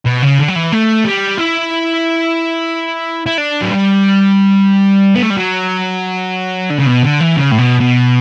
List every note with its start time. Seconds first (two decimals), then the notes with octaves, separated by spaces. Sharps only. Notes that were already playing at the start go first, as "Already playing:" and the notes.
0.06 B2
0.22 C#3
0.39 D3
0.48 F#3
0.56 E3
0.73 A3
1.05 G3
1.38 E4
3.26 E4
3.38 D4
3.62 F#3
3.71 G3
5.15 B3
5.22 A3
5.30 G3
5.37 F#3
6.70 D3
6.79 C#3
6.87 B2
7.03 D3
7.20 E3
7.37 C#3
7.52 A2
7.59 B2
7.81 B2